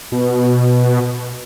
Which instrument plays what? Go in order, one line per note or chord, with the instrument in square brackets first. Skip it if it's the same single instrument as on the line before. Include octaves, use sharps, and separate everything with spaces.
[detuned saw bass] B2